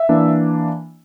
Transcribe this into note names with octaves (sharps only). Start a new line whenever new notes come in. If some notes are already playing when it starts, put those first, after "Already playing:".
Already playing: E5
E3 A#3 D4